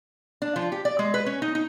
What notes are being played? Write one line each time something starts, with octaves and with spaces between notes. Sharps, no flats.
D4
F3
G4
D5
G#3
B4
C#4
D#4
D#4